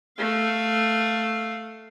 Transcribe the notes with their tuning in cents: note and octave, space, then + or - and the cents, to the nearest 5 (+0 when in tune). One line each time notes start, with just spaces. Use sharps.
A3 +5 F5 +0